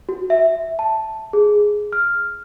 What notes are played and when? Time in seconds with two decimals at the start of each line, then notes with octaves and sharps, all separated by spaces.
0.09 F#4
0.30 E5
0.79 A5
1.33 G#4
1.93 F6